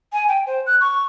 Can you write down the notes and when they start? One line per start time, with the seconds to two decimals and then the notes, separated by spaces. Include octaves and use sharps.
0.13 G#5
0.28 G5
0.47 C5
0.66 F#6
0.81 C#6